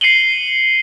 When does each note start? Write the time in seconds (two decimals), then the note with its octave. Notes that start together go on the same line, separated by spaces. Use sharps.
0.01 C7 C#7 D#7 F#7 G7